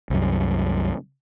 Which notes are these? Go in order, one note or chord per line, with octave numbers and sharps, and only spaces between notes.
C2 F#2